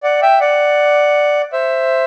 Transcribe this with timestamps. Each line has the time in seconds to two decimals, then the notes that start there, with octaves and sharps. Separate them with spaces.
0.03 D5 F#5
0.22 E5 G5
0.41 D5 F#5
1.53 C5 E5